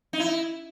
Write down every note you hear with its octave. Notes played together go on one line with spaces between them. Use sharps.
D#4
E4